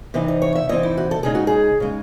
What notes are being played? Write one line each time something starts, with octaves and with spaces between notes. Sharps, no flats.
C3 E3 C4 D#4
D#5
C#5
E5
C3 E3 C4 D#4 D#5
E4
F#4
A4
C#3 G#3 D#4 G#4
F#4
G#4
C#3 G#3 D#4